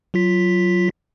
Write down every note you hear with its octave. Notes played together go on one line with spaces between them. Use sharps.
F#3 F4 B6